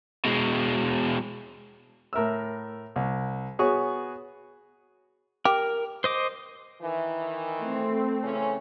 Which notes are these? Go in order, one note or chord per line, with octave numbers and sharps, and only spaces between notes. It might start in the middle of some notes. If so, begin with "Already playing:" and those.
B2 G#3
A2 A#4 E5 E6
C2
B3 F#4 G#4 C#5 C#6
G4 A#4
C5 D#5 D6
D#3 E3
A3 C4
C#3 E3 C#4